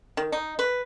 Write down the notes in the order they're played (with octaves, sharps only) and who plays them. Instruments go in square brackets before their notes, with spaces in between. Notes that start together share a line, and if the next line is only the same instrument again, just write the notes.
[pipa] D#3
D#4
B4